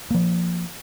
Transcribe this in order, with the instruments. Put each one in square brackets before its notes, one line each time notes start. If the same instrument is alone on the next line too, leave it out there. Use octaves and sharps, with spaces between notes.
[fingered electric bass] F3 A#3